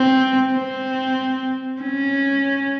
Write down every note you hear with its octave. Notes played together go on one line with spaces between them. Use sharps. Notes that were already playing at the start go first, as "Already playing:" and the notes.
Already playing: C4
C4
C#4